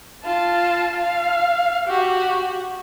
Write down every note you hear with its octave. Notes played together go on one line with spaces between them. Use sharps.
F4 A5
F5
F#4 G4